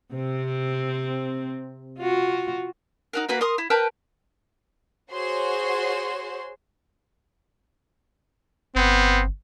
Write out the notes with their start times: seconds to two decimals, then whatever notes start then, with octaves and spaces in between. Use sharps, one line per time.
0.14 C3 C4
1.98 F4 F#4
3.13 D#4 F#4 A#4
3.29 A#3 F#4 B4 B5
3.41 A#4 C6 D#6
3.58 E4
3.70 A#4 B4 G5 A5
5.11 F#4 G#4 C5 C#5 C6
8.76 G1 B3 C4